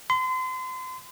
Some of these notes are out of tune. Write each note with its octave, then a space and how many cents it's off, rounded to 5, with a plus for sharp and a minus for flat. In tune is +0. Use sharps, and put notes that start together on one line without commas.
C6 -35